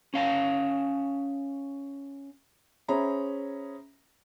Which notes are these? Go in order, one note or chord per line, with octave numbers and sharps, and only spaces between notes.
C#4 F5 A5
C#4 G#4 C5 E5 A#5 B5